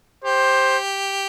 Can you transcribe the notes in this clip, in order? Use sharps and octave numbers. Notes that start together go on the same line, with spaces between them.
G4 C5